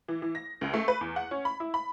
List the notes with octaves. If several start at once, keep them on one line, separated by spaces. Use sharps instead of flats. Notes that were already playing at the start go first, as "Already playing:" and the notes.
E3
E3
A#6
C#2
A3
B4
E2
F#5
C#4
B5
E4
B5